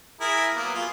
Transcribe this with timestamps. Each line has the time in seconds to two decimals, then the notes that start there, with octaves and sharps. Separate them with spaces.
0.21 E4 G#4 A#4
0.55 F#3 A#3 B3
0.75 F4 G#4